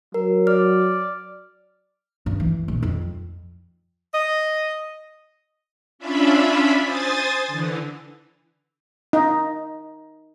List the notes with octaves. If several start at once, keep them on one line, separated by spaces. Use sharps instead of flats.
F#3 A#4
D5 F6
G2
E3
A#1
F2
D#5
C#4 D4 F4 E5 B5
C5 G#5 D#6 A6
D3 E3
D#4